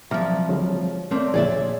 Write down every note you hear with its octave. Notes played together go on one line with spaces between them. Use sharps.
C2 F3 F#3 E5 A#5 D6 F6
D3 F#3 G#3 C#5
A3 A#3 C4 C#5 D5
A#2 D3 F3 G#4 C#5 D5 E5